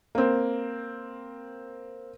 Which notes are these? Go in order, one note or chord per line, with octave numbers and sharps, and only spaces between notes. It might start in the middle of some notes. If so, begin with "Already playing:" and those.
A#3 C4